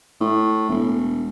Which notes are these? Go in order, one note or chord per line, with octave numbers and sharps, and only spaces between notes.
A2
E1